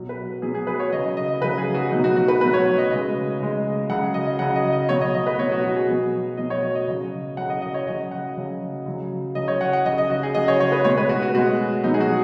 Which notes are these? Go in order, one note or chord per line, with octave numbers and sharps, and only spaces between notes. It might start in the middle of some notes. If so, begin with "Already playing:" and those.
Already playing: B2 F#3
B4
B2 F#3 G#4
G#4
B4
C#5
C#3 F#3 D#5
D#5
C#3 F#3 B4
G#4
F#4
B2 F#3 D#4
F#4
F#4
B4
B2 F#3 B4
C#5
D#5
C#3 G#3
C#3 G#3
C#3 F#3 F#5
D#5
C#3 F#3 F#5
D#5
D#5
B2 F#3 C#5
D#5
D#5
B4
B2 F#3 C#5
F#4
F#4
G#4
B2 F#3
B2 F#3 D#5
C#5
D#5
D#5
C#3 F#3
C#3 F#3 F#5
D#5
D#5
C#5
C#3 F#3 D#5
F#5
C#3 F#3
C#3 F#3
C#3 F#3 D#5
C#5
F#5
F#5
C#3 F#3 D#5
D#5
F#4
G#4
C#3 F#3 D#5
C#5
C#5
B4
B2 G#3 C#5
B4
F#4
F#4
B2 G#3 F#4
B2 F#3 D#4
G#4
F#4